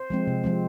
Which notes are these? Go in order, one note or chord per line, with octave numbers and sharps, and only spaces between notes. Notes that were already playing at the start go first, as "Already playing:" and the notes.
Already playing: C5
F3 G#3 C4
C3
F3 G#3 C4